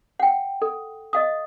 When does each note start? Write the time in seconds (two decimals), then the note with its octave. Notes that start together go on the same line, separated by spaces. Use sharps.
0.19 F#5 G5
0.62 A4
1.13 D#5 F5 D#6